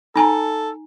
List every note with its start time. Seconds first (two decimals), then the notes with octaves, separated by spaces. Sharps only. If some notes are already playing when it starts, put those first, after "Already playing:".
0.16 D#4 A4 G#5 A#5